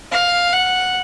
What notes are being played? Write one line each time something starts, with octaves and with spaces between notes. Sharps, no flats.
F5
F#5